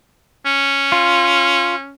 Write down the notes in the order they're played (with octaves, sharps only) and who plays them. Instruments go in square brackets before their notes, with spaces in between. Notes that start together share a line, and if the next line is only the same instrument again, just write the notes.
[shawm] C#4
[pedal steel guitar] F4